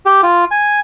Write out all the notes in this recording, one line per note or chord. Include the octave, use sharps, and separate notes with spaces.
G4
F4
G#5